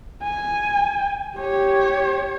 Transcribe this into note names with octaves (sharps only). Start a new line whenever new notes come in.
G#5
G4 C#5